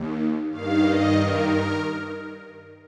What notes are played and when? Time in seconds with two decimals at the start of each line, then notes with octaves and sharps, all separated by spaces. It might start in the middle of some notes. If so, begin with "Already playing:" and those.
Already playing: D#2
0.50 G2 D#3 F5
0.82 D#5
1.13 A#4
1.44 A#4